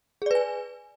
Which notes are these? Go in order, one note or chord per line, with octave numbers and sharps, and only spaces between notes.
G#4 B4 D5 G#5